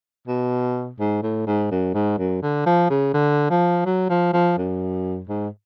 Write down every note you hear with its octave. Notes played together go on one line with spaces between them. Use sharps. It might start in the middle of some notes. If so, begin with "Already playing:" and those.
B2
G#2
A2
G#2
F#2
G#2
F#2
D3
F3
C#3
D3
F3
F#3
F3
F3
F#2
G#2